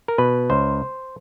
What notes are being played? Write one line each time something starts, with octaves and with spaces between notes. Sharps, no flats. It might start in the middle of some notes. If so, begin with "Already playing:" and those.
A#4
B2 B4
C#2 C5